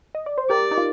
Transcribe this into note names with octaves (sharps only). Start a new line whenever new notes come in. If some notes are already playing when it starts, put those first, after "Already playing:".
D#5
D5
C5
G4 A#4 D5
D#4
F4